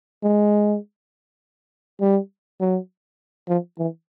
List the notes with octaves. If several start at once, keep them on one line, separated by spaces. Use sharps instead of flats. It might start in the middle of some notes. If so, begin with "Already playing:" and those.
G#3
G3
F#3
F3
E3